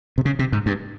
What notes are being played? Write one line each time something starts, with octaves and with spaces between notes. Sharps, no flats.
C3
C#3
C3
G#2
G2